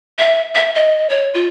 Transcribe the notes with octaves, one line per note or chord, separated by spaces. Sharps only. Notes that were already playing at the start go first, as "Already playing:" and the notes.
E5
E5
D#5
C#5
F4